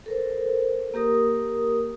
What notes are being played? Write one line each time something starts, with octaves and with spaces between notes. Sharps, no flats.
A4 A#4 C5
A#3 G4 A#4 D#6